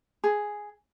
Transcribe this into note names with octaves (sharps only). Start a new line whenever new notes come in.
G#4